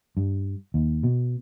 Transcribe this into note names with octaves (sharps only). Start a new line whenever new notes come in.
G2
D#2
B2